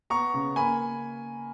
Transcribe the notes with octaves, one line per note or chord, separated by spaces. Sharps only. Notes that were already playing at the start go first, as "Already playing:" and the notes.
B3 A#5 C#6
C#3
A#3 G#5 B5